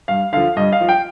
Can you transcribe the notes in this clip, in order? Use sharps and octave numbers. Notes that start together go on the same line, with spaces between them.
G2 F5
D3 F3 F5
G2 D#5
F5
F3
G5